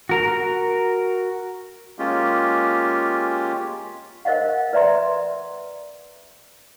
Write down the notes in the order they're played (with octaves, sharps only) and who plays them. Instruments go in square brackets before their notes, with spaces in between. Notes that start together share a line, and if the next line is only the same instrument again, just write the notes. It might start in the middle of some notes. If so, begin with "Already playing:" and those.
[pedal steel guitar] F#4 A#4 A#5
[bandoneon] G#3 A#3 C#4 F4 G4
[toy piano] A#4 C5 D#5 F5 F#5
B4 D5 E5 A#5 C6